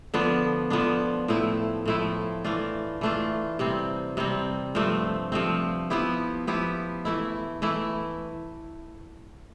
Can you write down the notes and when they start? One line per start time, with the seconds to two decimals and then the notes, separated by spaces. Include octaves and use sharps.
0.14 D3 F3 B3 D4
0.70 D3 F3 B3 D4
1.28 A2 F3 A3 E4
1.86 A2 F3 A3 E4
2.44 E3 A3 D4 F4
3.01 E3 A3 D4 F4
3.59 C3 G3 C4
4.17 C3 G3 C4
4.75 G2 F3 A3 C4
5.32 G2 F3 A3 C4
5.90 F3 B3 E4 G4
6.47 F3 B3 E4 G4
7.05 E3 A3 E4
7.62 E3 A3 E4